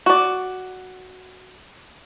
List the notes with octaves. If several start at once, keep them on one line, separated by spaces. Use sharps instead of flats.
F#4 D5